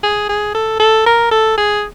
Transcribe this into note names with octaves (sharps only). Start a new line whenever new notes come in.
G#4
G#4
A4
A4
A#4
A4
G#4